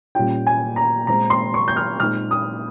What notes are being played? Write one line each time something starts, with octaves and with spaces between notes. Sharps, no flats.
A#2 G3 C#4 F4 G5
G#5
A#5
A#2 G#3 C4 F4 A#5
C6
C#6
G6
F6
A#2 G#3 C4 D#4 F6
D#6